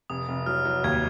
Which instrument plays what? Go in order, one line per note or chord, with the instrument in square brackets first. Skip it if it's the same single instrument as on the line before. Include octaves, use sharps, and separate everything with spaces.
[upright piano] F1 [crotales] D#6
[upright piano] F1
[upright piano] F#3 [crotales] F6
[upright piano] F#3
[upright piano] D#2 [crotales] G#6